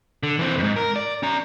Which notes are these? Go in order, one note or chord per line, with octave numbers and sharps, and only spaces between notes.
D3
E3 C4
F2 G#2
A#4
D5
C#4 A#5